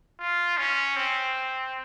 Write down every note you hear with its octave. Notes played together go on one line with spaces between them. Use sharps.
F4
C#4
C4